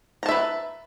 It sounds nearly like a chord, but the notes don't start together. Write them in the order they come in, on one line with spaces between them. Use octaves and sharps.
A#5 A5 E5 B4